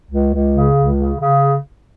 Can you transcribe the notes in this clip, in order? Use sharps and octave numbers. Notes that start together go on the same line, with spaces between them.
C#2
C#2
C#3
C#2
C#3
C#3